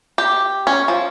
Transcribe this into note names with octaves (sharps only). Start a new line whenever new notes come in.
G4
C#4
F3